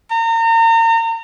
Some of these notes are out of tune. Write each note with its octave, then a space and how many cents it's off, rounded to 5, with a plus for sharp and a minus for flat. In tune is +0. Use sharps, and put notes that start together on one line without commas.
A#5 -35